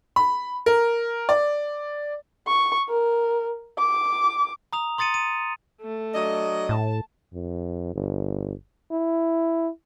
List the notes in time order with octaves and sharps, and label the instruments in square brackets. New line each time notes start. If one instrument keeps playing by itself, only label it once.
[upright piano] B5
A#4
D5
[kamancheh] C#6
A#4
D6
[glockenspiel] A#5 D#6 F7
C6 D#6 A6 C#7 D#7
D#7
[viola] A3
[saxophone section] F#3 D4 D#5
[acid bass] A2 [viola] A5
[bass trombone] F2
G1
E4